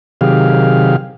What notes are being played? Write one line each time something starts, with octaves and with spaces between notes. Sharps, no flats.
C3 D#3 F#3 G4 G#4 F5